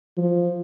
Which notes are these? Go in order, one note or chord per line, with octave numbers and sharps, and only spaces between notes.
F3